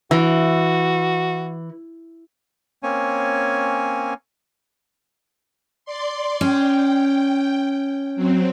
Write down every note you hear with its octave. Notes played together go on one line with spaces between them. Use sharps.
E3 F#4
A#3 C4 C#4 C#5 G#5
D5 C6
C#4 G5
F#3 C4